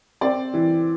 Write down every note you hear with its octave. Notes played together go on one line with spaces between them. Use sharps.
C4 D5
E3